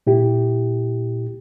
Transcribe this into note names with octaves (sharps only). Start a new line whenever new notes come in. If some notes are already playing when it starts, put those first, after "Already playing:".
A#2 E4 G4